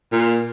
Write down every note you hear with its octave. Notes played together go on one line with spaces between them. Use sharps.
A#2